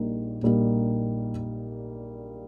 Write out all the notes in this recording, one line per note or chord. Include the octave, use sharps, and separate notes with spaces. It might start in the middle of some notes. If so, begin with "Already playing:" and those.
Already playing: A#1 A#2 G3 A#3 D#4
A#1 A#2 G3 A#3 D#4